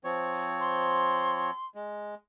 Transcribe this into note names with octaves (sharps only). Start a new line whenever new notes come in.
F3 C4 C#5
C6
G#3